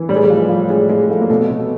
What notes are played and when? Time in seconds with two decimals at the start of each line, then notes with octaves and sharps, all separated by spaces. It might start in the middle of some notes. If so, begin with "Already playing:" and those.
Already playing: E3
0.09 A2 G3
0.16 G#3
0.24 G3
0.30 F3
0.49 F3
0.70 A2 G#3
0.89 A2 G#3
1.09 F3 A3
1.21 A#3
1.30 B2 A3
1.50 B2